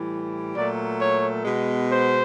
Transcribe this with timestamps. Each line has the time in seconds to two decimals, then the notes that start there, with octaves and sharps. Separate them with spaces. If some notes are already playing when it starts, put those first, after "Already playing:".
Already playing: A2 E3 G3
0.55 A#2 F#3 A3 D5
1.00 C#5
1.45 B2 G#3 B3
1.89 C5